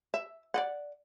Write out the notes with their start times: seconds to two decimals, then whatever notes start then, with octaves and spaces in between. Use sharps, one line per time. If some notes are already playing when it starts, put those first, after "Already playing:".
0.14 E5
0.54 D5 D#5 F#5